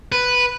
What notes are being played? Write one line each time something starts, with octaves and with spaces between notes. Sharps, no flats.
B4